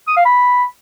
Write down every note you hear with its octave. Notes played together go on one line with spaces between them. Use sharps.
D#6
F5
B5